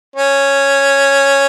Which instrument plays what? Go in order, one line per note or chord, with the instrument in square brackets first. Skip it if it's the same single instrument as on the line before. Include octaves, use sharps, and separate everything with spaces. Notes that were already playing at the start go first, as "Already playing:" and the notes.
[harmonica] C#4